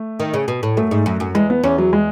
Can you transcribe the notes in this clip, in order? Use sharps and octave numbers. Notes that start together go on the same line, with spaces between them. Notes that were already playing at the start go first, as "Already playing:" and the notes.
Already playing: A3
D#3
C#3
B2
A2
F#2 A3
G#2
F#2
F#2
E2 G#3
B3
E2 C#4
F#3
G#3